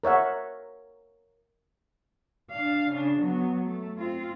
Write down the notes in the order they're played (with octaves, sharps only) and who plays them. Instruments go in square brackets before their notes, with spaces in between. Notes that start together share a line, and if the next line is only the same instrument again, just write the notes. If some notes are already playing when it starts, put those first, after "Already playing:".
[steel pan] A#4 C#5 E5 F#5
[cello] D4 F5
C#3 D4
F#3 B3
A3
C4 F4